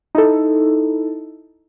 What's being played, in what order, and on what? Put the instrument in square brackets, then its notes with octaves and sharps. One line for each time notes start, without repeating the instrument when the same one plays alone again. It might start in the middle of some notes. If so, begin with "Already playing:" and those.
[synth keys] D#4 E4 A4